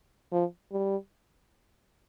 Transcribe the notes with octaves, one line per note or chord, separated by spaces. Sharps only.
F3
G3